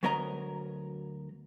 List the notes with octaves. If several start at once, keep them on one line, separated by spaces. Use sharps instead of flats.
D2 F#3 B3 A#4 D#5 A#5